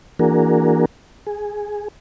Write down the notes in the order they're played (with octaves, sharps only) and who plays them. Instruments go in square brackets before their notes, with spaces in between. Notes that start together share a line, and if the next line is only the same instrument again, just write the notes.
[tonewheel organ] E3 A#3 D4 F#4 G#4 A#4
G#4